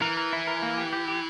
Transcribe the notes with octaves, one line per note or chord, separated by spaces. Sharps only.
E3 A#4
A#4
E4
A#4
A#3
G4
G4
G4